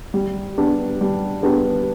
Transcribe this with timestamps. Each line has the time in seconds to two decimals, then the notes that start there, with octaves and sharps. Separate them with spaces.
0.14 G3
0.58 B3 D4 G4
1.01 G3
1.43 B3 D4 G4